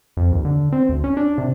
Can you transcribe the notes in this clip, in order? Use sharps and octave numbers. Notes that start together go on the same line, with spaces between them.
F2
D#2
D3
C4
D2
C#4
D4
C3